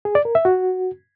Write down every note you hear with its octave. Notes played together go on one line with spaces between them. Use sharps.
G#4
D5
A#4
E5
F#4